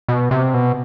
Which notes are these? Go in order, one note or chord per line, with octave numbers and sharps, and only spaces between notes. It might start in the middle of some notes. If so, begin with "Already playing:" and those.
B2
C3
B2